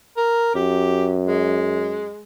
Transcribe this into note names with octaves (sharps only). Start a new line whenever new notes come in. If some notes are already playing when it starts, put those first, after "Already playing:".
A#4
F#2 G4
G#3